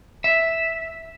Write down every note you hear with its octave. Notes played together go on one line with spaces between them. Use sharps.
E5